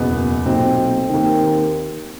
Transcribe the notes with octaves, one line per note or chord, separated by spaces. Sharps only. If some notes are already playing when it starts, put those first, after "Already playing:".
Already playing: F#1 E2 B2 B3
B1 A#2 C4
D#2 D#3